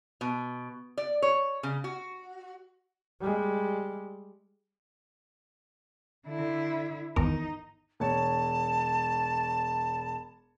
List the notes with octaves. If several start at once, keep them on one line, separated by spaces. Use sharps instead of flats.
B2
D5
C#5
C#3
F#4
G3 G#3
D3 E4
G#1 E2 D#4 A#4
E1 C#5 A5